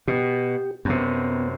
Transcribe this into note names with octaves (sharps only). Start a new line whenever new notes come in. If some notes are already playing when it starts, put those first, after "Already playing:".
B2 G4
F#2 C3 B3